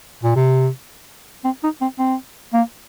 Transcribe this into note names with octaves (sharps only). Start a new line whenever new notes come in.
A#2
C3
C4
D#4
C4
C4
A#3